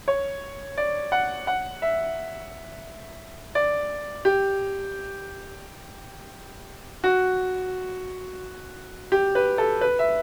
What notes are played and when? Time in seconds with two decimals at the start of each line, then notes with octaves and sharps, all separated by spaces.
0.08 C#5
0.78 D5
1.12 F#5
1.47 F#5
1.82 E5
3.55 D5
4.25 G4
7.04 F#4
9.12 G4
9.35 B4
9.58 A4
9.81 B4
9.99 E5